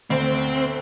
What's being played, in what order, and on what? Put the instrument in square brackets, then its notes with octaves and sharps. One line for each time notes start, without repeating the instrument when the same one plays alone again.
[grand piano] D2 [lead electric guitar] C4